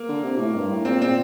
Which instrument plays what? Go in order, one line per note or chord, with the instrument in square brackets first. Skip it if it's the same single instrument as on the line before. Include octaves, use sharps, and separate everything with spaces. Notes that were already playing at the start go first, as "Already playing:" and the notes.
Already playing: [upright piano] A#3
[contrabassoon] D3
C3
A2
G2
A2
[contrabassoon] A#2 [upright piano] C4
[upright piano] C4